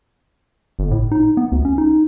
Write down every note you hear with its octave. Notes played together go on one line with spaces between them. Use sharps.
G1
A2
D#4
B3
D2
C#4
D#4